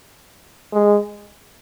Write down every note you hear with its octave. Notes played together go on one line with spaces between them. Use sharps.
G#3